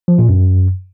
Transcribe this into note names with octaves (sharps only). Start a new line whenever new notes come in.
F3
A#2
F#2